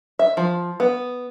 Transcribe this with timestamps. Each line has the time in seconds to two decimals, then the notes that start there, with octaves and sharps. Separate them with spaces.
0.19 E5
0.37 F3
0.80 B3